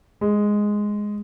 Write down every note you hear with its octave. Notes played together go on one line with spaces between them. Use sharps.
G#3